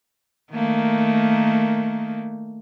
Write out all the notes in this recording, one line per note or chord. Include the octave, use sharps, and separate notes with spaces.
D#3 A3 A#3